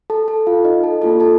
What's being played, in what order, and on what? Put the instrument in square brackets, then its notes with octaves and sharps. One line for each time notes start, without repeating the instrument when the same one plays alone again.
[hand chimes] A4 A5
A4 A5
F4 F5
D#4 D#5
A4 A5
A#3 D4 F4 A4 A5
A4 A5